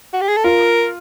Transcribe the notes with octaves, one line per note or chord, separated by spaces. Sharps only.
F#4
G4
G#4
A4
F4 A#4